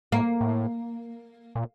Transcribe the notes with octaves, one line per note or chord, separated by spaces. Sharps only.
A2 A#3
A2
A#2